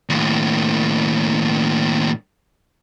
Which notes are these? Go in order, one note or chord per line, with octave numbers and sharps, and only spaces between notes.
D#2 A2